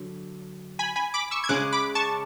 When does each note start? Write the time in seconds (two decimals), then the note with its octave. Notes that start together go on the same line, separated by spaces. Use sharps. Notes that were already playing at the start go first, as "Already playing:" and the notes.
Already playing: D3 F#3
0.79 G#5 B5
0.96 G#5 B5
1.14 B5 D6
1.31 C#6 E6
1.44 G#6
1.49 C#3 G#3 C#4 D6 F#6
1.72 B5 D6
1.95 A5 C#6